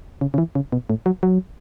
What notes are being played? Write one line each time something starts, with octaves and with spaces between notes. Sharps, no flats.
C#3
C#3
E3
C#3
B2
A2
F#3
F#3